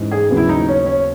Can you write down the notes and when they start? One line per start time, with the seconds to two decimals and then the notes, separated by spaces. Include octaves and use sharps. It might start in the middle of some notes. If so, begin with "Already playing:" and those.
Already playing: G#2 E3 G#3 C#4
0.11 G#4
0.30 D#2 C#3 F#3 B3
0.37 E4
0.49 D#4
0.68 C#4
0.86 C#4